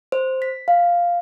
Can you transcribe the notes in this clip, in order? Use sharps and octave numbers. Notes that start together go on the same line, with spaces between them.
C5
B6
F5